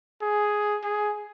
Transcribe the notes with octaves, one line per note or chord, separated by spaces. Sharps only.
G#4
G#4